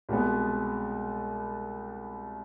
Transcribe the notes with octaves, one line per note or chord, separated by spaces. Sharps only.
C2 B2 G#3 B3 G4